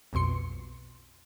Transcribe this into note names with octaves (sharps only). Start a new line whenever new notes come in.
B1 F2 B2 C6 C#7